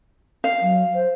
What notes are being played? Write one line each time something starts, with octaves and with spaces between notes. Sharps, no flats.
F5
F#3
C5